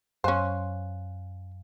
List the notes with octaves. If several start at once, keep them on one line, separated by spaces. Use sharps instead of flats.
F#2 C#4 C5 F5 G#5 F#6